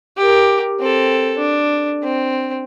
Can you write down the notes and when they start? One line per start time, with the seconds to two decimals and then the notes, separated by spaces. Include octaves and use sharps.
0.17 G4 A#4
0.80 C4 A4
1.38 D4
2.03 C4